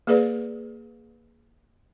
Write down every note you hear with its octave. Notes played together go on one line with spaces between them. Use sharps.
A#3 G#4 B4 D5